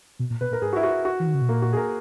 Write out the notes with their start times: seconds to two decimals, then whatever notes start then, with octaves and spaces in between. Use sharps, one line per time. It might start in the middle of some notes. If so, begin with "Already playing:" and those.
0.19 B2
0.30 A#2
0.41 B2 B4
0.51 A#2 A#4
0.61 G#2 G#4
0.73 F#4
0.76 E4
0.83 F#4
0.91 E4
1.05 F#4
1.20 E3
1.27 D#3
1.34 C#3
1.41 B2
1.49 A#2 A#3
1.62 F#4
1.73 G#4
1.76 A#4